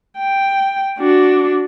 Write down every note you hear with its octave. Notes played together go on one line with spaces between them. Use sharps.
G5
D4 F#4